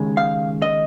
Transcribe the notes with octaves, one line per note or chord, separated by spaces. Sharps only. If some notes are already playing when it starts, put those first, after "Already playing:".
Already playing: D#2 C#3 G#3
F5
D#5